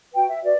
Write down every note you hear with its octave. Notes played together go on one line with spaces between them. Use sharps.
F#4 B4 G5
E5
F#4 B4 D5